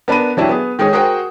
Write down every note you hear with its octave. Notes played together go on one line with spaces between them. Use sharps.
B3 D4 A#4 B5 D#7
F#3 D4 E4 G4
B3 G#4
D#3 G#3 D#4 G#4 C#5
F#4 G#4 A#4 C5 F#5 G5